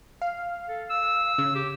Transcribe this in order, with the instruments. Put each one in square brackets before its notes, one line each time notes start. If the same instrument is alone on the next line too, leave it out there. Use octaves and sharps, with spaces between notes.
[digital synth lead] F5
[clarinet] A4
E6
[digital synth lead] C#3
[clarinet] G4